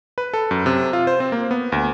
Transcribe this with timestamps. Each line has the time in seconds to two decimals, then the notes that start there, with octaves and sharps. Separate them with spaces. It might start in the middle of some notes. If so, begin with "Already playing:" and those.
0.18 B4
0.34 A4
0.51 F#2
0.66 C3
0.93 F4
1.07 C5
1.20 C4
1.32 A#3
1.51 B3
1.72 D2